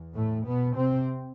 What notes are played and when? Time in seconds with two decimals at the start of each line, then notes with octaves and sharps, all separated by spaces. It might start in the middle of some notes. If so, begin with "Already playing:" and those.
Already playing: E2
0.15 A2 A3
0.46 B2 B3
0.76 C3 C4